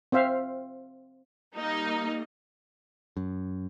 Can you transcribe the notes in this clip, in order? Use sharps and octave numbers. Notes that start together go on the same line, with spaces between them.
C4 C5 E5 F5
G3 A#3 D#4 D#5
F#2